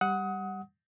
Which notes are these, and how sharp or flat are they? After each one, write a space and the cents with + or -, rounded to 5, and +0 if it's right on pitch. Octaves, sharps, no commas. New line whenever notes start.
G3 +0 F#5 +0 D#6 +30